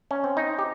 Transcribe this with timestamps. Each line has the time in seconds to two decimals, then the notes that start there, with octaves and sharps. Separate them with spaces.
0.11 C#4
0.24 C4
0.37 D#4
0.59 G4